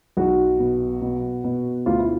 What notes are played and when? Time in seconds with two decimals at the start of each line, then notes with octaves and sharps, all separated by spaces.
0.17 B1 F#4
0.59 B2
1.01 B2
1.44 B2
1.86 D2 F4
1.99 E4